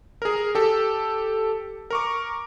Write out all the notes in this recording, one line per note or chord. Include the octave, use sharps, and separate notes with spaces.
G#4 A#4
G4 A4
A#4 C#6 D6